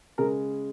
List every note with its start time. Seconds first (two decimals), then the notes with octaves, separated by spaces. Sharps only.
0.18 C#3 G#3 A#4